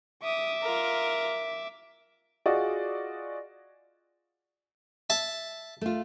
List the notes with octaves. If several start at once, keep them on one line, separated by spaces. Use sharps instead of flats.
E5 D6 D#6
F4 A#4
F4 F#4 G#4 D5 D#5
E5 A5
A3 F4